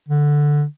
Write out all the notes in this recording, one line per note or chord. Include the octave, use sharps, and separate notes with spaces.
D3